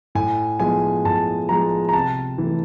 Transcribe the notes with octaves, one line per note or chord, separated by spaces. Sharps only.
A2 G#5
F3 G#3 B3 G#5
A2 A5
F3 G#3 B3 A#5
A#5
C3 A5
E3 A3